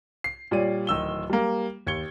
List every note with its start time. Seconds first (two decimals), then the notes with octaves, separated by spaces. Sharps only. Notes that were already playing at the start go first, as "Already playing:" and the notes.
0.24 C7
0.51 A#2 G3 C#5 D5 D#7
0.87 D1 D#3 E6 G7
1.30 G3 A#3
1.87 D#2 G#6 C#7 G7